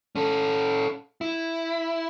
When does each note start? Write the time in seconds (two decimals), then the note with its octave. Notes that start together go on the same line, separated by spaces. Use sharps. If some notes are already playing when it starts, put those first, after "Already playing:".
0.16 C#4 A4
1.21 E4